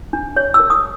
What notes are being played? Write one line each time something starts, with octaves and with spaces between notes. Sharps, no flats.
D4
C#5
E6
A#4
D#6